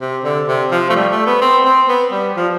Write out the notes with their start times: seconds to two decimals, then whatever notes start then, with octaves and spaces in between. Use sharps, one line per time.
0.01 C3
0.24 D3
0.48 C3
0.72 F3
0.90 A3
0.95 G3
1.11 A3
1.27 B3
1.41 C4
1.66 C4
1.89 B3
2.12 G3
2.37 F3